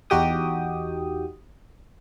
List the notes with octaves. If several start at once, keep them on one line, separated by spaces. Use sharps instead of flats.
E2 D#4 F#4 G4 G5 D#6